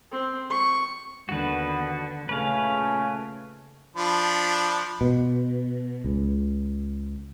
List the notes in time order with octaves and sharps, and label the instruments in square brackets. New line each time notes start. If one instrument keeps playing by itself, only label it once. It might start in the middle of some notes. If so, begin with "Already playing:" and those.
[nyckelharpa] C4
C#6
[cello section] D#2 D3 [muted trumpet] B3 [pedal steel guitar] F#4 B4
[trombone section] A#2 A3 [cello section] C#3 [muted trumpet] C#4 [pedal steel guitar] B4 F5
[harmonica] F3 D4 B5
[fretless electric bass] B2
C#2